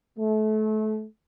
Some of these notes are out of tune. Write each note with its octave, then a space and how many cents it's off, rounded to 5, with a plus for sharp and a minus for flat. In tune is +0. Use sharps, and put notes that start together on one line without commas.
A3 -30